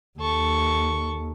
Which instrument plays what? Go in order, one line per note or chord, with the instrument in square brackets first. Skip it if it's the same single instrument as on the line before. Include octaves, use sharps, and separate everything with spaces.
[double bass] D#2 [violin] A4 C#6